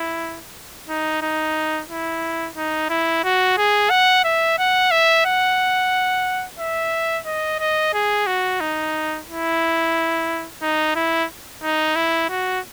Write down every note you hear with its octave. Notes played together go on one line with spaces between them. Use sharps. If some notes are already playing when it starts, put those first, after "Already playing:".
Already playing: E4
D#4
D#4
E4
D#4
E4
F#4
G#4
F#5
E5
F#5
E5
F#5
E5
D#5
D#5
G#4
F#4
D#4
E4
D#4
E4
D#4
E4
F#4